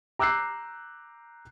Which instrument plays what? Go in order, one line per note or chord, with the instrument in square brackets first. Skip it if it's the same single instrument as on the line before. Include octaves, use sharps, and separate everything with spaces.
[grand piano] A#5 D6 E6 F#6 G6 C7